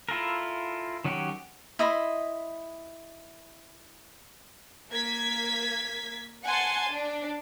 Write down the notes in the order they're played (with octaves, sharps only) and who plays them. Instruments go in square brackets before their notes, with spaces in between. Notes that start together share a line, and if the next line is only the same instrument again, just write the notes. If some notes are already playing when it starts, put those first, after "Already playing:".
[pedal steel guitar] E4 F4 A4 A#4
D#3 F#3 C#4 F#4 G4
[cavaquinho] E4 D#5 B5 C6
[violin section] A#3 G#6 B6
F#5 G#5 A5 C6
D4